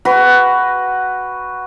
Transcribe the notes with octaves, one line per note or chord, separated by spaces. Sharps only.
F#4 B4